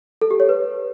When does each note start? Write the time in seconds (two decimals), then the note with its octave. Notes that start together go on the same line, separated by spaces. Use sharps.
0.22 A4
0.31 G4
0.40 C#5
0.49 B4